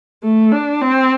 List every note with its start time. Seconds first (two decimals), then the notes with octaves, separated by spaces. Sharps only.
0.24 A3
0.52 D4
0.82 C4